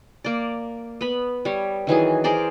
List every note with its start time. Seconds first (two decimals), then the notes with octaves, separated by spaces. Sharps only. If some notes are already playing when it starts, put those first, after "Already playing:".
0.24 A#3 D5
1.01 B3 B5
1.45 G3 C#5
1.87 D#3 E3 F#3 G#4
2.24 G#4 A#4 C5 D5